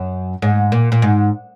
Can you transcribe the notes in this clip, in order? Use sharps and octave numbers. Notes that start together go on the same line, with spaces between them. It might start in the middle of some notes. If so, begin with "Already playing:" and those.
Already playing: F#2
G#2
A#2
A#2
G#2